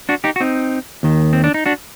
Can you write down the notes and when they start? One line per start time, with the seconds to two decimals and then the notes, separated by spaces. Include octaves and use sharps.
0.09 D4 F#4
0.24 D#4 G4
0.36 F#4
0.40 C4 D#4
1.03 D#2 D#3
1.33 C4
1.44 D4
1.54 D#4
1.66 D4 F#4